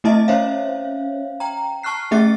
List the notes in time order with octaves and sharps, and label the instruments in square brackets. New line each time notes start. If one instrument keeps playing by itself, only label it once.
[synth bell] A3 C4 E4 D#5 E5 A5
C#4 C5 C#5 E5 F5
G5 A#5
A5 C#6 F6 F#6 C7
A3 C#4 G#4 E5 A6